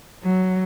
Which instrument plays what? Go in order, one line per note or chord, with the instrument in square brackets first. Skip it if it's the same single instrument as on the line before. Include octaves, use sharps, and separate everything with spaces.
[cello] F#3